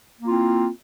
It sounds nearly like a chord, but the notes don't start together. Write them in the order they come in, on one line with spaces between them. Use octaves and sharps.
A#3 F4 C4 E4